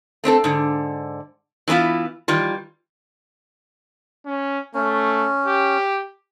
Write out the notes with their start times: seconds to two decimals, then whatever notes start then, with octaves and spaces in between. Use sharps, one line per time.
0.24 A3 C4 D4 A4
0.44 G#2 D3
1.68 E3 F#3 B3 E4 F4
2.28 D#3 E3 G3 F4
4.26 C#4
4.74 A3 C#4
5.46 G4